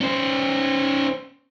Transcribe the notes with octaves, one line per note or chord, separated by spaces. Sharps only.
C#4 C5